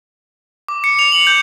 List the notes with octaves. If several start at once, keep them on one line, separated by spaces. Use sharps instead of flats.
D6
C#7
F7
F#7
G6